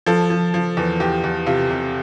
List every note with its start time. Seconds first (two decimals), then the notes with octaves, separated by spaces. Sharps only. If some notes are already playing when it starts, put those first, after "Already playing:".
0.06 F3 A4
0.30 F3
0.54 F3
0.77 E2
1.00 E2 G4
1.24 E2
1.46 C3 F4
1.70 C3